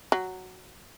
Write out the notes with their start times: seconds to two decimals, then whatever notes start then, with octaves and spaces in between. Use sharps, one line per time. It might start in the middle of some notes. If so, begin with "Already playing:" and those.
0.12 F#3